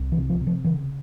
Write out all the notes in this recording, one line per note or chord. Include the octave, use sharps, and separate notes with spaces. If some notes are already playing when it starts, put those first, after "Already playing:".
Already playing: C2
E3
C3
F3
C3
F3
C#3 E3